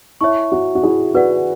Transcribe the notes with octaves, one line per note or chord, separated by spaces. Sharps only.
E4 C#5 E5 A5 C#6
F#4
F#4
E4 G#4
F#4 B4 D5 F#5